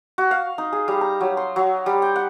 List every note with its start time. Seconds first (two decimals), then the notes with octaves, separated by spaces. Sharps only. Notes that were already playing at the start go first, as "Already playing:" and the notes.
0.18 F#4
0.31 F5
0.58 D#4
0.73 G#4
0.88 G3
1.01 A#5
1.21 F#3
1.37 C6
1.56 F#3
1.86 G3
2.02 G5
2.16 F#5